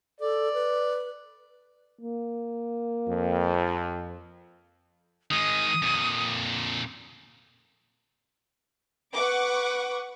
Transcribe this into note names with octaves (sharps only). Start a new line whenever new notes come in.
A4 D5
B4
A#3
F2
D#3 G#3 D#6
F2 A#2
B4 F#5 C#6 D6